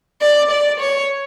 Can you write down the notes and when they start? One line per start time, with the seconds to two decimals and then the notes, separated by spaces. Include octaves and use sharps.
0.22 D5
0.51 D5
0.80 C#5